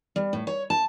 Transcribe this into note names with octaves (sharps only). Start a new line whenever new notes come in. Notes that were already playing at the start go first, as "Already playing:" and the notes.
G3
A2
C#5
A5